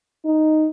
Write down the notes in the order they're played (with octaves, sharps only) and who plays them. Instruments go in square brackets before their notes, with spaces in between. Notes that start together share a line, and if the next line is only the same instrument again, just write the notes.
[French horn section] D#4